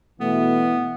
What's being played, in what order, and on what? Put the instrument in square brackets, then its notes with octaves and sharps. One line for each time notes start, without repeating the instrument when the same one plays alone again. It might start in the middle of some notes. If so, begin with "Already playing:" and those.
[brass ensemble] B2 E3 [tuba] A3 [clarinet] B3